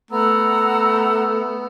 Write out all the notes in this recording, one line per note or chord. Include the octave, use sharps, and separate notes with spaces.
A3 B3 F#5 A#5 E6